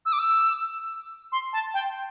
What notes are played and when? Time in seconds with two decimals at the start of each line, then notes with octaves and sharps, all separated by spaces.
0.06 E6
0.13 D6
0.19 E6
1.32 C6
1.53 A5
1.74 G5